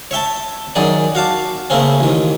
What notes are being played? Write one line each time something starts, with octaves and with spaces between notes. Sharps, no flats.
C#5 E5 G5 A5
F#2 D#3 F#3 G#4 D5
F#4 F5 A5 D6
C#3 A3 A#3 C4 C#4
A1 D#3